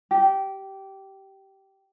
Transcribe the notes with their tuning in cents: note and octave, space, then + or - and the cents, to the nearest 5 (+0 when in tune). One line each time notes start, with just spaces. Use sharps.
G4 -15